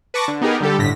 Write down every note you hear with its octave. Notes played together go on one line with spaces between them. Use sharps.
B4 A5 C#6 D6 A#6
D3
B3 D#4 G4 G#4 A#4
D3 G3 G4 A4
G1 A2 D3 A#6 B6